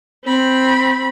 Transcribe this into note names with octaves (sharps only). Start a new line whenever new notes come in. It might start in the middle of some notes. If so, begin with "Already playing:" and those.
C4 B5